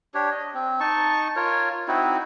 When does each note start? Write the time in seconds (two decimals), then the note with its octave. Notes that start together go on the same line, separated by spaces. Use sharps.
0.14 D4 G4 C#5
0.31 D#5
0.54 C4
0.80 D#4 A5 C#6
1.36 F4 A#4 C#5
1.88 C4 D#4 E4 F#4